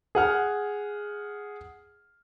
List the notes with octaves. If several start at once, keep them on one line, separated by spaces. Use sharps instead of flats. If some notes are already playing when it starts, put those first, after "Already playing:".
G#4 F#5 F6